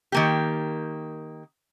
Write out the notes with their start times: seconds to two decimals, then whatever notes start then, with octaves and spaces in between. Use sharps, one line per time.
0.12 D#3 A#3 G4